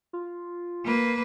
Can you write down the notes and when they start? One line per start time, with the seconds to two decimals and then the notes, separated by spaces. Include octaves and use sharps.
0.13 F4
0.85 A#3 B4